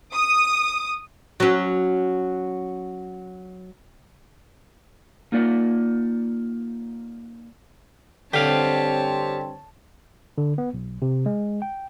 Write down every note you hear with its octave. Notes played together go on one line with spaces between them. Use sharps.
D#6
F#3 C#4
A#3 D#4 F4 D5 F#5
G2 D3 C4 G4 C#5 F5 A5
D3
B3
B1
C3
G#3
G5